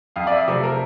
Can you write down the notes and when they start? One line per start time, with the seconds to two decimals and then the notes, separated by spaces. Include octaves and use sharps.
0.16 F2 F5
0.27 D5
0.32 E5
0.48 C3 F3 A3 C4 D5
0.63 A#4